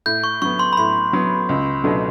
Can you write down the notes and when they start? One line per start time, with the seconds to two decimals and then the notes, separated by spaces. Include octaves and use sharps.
0.06 A2 G6
0.24 C#6
0.42 F#3 B3 C#6
0.59 C6
0.73 B5
0.77 A2 C6
1.13 F#3 B3
1.49 C#2
1.84 B2 F#3 A3 D4